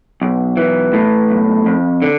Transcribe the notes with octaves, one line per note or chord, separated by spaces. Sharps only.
B1
E3
A2
B1
F2
D3